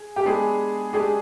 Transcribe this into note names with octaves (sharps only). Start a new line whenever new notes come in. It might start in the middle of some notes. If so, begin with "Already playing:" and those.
Already playing: G#4
G4
G#3 B3 D4 G#4
G#3 D4 G4 G#4